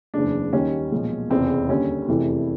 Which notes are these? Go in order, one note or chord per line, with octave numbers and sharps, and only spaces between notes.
F#1 E2 C#3 D4
D#2 D#3 G3 C#4
B1 A#2 F3 G#3
F1 E2 C#3 C4
D#2 D3 G3 C#4
F1 E2 C3 E3 A3